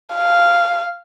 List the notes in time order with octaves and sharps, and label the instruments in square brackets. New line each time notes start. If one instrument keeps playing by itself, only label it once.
[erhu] F5